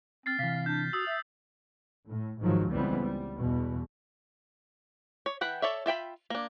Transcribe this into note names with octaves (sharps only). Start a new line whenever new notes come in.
C4 F6 A6 C7
C3 E3 F5 B6
D4 G6
F#4 D#6 E6
E5
A2
G#2 D#3 F3 F#3
C#2 E3 G3 B3 C4
G3
E2 B2
C#5
E3 F#5 G5 B5
A4 C#5 D5 E5
F4 E5 G5 B5
A#3 D4